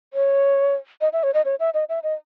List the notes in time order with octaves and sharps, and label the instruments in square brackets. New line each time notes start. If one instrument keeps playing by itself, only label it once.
[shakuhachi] C#5
D#5
E5
C#5
D#5
C#5
E5
D#5
E5
D#5